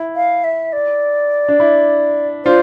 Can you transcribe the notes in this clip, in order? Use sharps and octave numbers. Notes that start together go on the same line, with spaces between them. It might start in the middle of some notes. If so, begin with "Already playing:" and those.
Already playing: E4
F5
E5
D5
D4
E4
D4 F4 C5